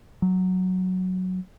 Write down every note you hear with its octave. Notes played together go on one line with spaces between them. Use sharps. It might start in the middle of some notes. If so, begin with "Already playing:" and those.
F#3